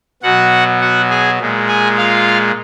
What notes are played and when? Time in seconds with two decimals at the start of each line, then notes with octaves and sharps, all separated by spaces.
0.23 B2 F#3 F#4 F#5
0.80 F#4 F#5
1.10 G#4 G#5
1.40 A#2 G#3
1.68 G#4 G#5
1.97 F4 F5